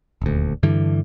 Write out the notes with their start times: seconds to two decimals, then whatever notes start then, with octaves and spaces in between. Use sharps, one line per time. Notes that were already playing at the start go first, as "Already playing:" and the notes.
0.22 D#1 D2
0.63 G2 D3 E3